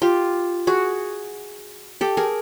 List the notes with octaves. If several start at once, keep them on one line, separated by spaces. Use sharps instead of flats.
F4 G4
F#4 G#4
G4 A4
G#4 A#4